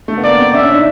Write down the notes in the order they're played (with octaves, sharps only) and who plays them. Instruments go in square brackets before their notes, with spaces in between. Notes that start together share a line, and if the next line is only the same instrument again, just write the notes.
[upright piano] A3
B3
[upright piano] A#3 [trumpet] D5
[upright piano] C4
[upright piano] C#4 [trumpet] E5
[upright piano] D4
D#4